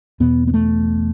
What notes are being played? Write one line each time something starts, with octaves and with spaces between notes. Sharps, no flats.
E2 B2 B3
B3
A3